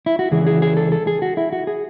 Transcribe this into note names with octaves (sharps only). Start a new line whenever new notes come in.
E4
F#4
C#2 C#3 E3 G#4
G#4
G#4
A4
A4
G#4
F#4
E4
F#4
G#4